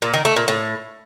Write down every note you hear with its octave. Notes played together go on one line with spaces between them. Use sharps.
A#2
D#3
A3
A#2
A2